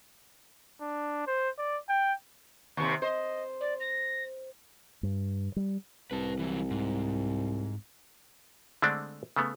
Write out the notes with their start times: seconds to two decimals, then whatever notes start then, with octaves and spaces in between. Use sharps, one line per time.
0.81 D4
1.27 C5
1.58 D5
1.89 G5
2.77 D#2 C3 C#6
3.02 C5 D#5
3.61 D5
3.80 A#6
5.03 G2
5.56 G3
6.11 C2 B4 A5
6.39 E3 F#3
6.70 G#2
8.82 D3 G#3 A3 C4 D4
9.36 C#3 A3 B3